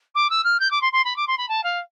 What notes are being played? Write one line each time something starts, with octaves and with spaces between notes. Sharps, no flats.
D6
E6
F6
G6
D6
C6
C6
B5
D6
C6
B5
A5
F5